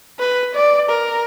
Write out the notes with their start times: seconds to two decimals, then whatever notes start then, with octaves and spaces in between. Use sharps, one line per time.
0.19 B4
0.54 D5
0.89 A#4